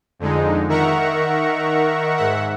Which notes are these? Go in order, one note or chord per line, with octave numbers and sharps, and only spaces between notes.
F2 D3 G#3 D#4
D#3 A#4 E5 F#5 A#5 C#6
G#2 E5 F#5